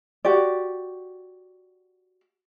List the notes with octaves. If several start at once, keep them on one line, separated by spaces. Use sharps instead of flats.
F#4 G4 D5